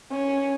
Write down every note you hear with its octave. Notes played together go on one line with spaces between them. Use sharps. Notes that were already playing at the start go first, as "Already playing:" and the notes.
C#4